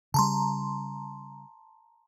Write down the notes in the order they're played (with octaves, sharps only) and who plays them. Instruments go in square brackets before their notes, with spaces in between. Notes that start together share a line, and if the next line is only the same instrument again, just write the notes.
[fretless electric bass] C#3 G3 [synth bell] A5 A#5 C6